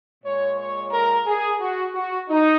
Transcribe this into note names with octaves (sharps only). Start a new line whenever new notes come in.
A#2 G#3 C#5
C#5
A#4
G#4
F#4
F#4
D#4